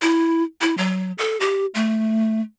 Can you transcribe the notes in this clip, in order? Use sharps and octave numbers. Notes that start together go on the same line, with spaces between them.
E4
E4
F#3
A4
G4
A3